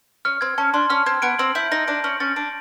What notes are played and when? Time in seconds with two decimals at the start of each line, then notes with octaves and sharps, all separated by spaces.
0.25 C#4 F6
0.41 C4 G#6
0.58 C#4 A5
0.74 D4 C6
0.90 C#4 F6
1.06 C4 G#6
1.22 B3 D7
1.39 C4 F#7
1.55 E4 G6
1.72 D#4 A#6
1.87 D4 D7
2.04 C#4 F#7
2.20 C#4 A6
2.36 D4 D7